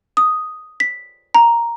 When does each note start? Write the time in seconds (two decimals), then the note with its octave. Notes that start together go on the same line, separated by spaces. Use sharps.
0.17 D#6
0.80 B6
1.34 A#5